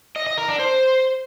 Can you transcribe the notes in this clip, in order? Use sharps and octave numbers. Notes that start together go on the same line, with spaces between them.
D#5
D#5
A#4
D4
C5